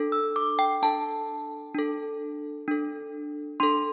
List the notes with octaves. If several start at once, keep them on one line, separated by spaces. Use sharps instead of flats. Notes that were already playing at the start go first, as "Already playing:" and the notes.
Already playing: D4 A4
E6
D6
G5
D4 A4 A5
D4 A4
D4 A4
D4 A4 C6